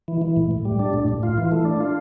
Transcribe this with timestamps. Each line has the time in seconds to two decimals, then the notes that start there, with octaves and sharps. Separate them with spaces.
0.08 E3
0.22 E3
0.36 A2
0.51 A2
0.65 G3
0.79 D4
0.93 A2
1.08 A2
1.23 F4
1.38 E3
1.52 A3
1.65 D4
1.80 F4